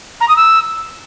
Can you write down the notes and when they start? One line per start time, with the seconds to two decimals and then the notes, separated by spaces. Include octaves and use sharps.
0.20 A#5
0.28 D#6
0.36 E6